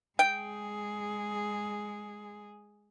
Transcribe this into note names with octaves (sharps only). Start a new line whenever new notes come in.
G#3 G#4 G5